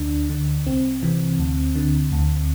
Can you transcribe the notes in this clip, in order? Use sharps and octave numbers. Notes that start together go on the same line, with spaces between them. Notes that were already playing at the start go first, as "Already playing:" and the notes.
Already playing: D2 D4
D3
C2 C4
C3 E3
D2
D3
D2